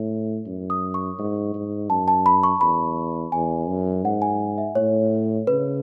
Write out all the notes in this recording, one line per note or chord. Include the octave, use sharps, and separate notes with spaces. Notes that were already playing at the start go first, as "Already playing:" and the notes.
Already playing: A2
F#2
D#6
C#6
G#2
G#2
F#2 A5
A5
B5
C#6
E2 B5
E2 G#5
F#2
G#2 F#5
G#5
E5
A2 C#5
C#3 B4